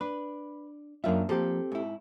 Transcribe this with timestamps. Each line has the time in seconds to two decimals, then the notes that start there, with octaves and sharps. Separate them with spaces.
0.01 D4 B4
1.04 F#2 A#3 D4 F4 E5
1.29 F3 A#3 C4 G4 A4
1.72 G#2 E4